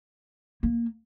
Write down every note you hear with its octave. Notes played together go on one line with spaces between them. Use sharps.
A#3